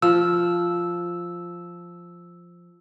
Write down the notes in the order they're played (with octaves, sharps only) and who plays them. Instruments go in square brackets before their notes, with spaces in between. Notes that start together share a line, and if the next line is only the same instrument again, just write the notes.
[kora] F3 [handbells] E6